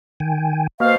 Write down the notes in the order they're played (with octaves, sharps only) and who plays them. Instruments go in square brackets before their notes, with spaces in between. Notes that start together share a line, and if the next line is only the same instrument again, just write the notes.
[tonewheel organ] D#3 G5 G#5
[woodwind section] B2 C5 F5 [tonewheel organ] A#3